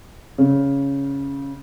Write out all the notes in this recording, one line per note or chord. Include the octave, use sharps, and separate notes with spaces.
C#3